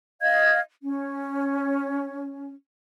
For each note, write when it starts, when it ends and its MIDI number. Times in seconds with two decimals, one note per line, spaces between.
0.21 0.59 75
0.21 0.59 77
0.21 0.59 92
0.84 2.53 61